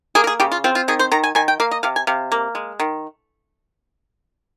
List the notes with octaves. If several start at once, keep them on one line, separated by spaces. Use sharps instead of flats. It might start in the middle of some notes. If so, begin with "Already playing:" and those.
A#3 G#4
A#4
G#4
C#3 G4
F4
C4 F4
F4
D#3 G#4
C5
D#3 A#5
G#5
D#3 G#5
G5
A#3 F5
D#5
C3 F5
G#5
C3 F5
A#3
G#3
D#3